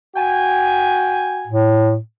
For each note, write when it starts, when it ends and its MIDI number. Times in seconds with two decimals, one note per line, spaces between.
0.16 1.49 66
0.16 1.49 79
0.16 1.49 80
1.47 1.97 45